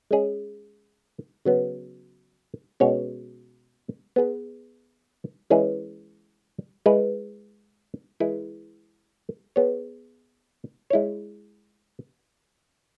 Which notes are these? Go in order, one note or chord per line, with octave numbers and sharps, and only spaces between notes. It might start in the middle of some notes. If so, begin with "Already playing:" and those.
G#3 C#4 G#4
C#3 F#3 B3
B2 G#3 C#4 F#4 C#5
B3 G#4 B4
E3 G#3 C#4 E4 G#4
G#3 E4 B4
E3 G#3 E4 G#4 B4
B3 G#4 C#5
G#3 E4 C#5